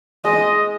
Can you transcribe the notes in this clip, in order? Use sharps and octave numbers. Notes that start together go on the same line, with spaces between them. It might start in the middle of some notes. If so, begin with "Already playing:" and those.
G#3 D#5